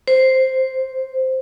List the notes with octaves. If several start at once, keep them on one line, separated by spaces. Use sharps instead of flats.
C5